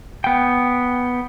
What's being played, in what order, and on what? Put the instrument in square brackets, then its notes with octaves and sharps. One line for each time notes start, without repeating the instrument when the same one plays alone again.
[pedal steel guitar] B3 G5